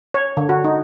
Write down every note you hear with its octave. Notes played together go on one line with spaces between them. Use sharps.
C#5
D3
F#4
D#4